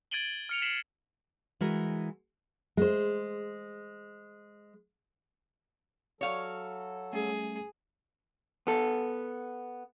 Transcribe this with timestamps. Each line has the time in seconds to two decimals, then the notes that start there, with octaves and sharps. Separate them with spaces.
0.11 G#6 A6 D7 D#7 F#7 G7
0.49 F6 C#7 F7
0.62 B6 C7 D7 E7 F#7
1.61 E3 G#3 F#4 A#4
2.77 G#3 C5
6.21 F#3 A4 C#5 F5
7.13 G3 A3 C#4 G#4
8.67 B3 A4